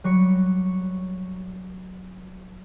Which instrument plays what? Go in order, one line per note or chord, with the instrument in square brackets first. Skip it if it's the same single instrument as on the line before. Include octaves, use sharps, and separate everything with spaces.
[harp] F#3 G3 C#6 B6 C#7